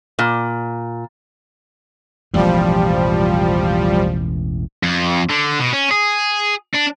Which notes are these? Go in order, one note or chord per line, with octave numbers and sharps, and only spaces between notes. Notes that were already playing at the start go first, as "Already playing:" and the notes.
A#2
E1 A1 A2 F3 G3
F2
D3
B2
C#4
G#4
D4